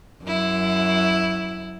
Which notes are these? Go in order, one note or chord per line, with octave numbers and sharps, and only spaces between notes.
F#2 E4